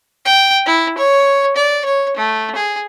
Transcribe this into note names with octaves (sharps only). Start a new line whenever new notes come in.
G5
E4
C#5
D5
C#5
A3
G#4